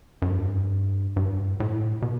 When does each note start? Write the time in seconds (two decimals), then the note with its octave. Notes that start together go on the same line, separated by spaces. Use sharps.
0.22 F#2
0.30 G2
1.16 G2
1.60 A2
2.02 B2